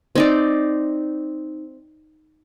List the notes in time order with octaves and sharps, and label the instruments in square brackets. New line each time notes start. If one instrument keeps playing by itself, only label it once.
[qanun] C4 D#4 D5